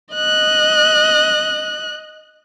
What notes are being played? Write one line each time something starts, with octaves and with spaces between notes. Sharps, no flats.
D#5 F#6